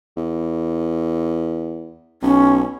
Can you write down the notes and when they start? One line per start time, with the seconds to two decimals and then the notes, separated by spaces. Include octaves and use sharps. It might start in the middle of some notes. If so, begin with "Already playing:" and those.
0.17 E2
2.22 B1 C#4